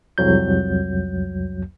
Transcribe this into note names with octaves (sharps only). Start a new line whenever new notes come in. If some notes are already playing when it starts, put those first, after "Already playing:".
C2 F2 F#3 G6